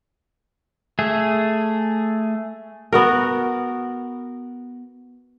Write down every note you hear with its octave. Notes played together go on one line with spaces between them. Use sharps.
A3 G#4
B3 F#4 A#4